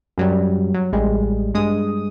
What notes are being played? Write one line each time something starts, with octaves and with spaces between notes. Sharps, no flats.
F#2 F#3 G3
F#3
A1 G3 G#3
G2 G#3 D#6